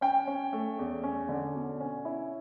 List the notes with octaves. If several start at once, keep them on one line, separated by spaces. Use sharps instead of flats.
C#4 G5
C#4
A3
E2
C#4
D3
B2
C#4
E4